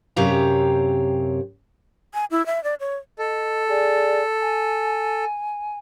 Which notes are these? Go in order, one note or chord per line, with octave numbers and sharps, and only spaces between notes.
F#2 C3 G4 C#5 F5 A#5
G#5
E4
E5
D5
C#5
A4 D#5
G#4 D5 G#5
G#5